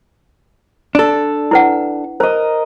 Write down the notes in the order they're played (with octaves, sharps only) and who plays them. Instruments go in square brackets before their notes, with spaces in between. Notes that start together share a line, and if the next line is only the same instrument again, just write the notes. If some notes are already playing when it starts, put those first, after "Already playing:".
[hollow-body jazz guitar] D4 A4
[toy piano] E4 B4 F#5
[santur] A#4 D#5 [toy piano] C5